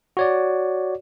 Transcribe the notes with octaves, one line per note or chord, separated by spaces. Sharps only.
F#4 C#5 D5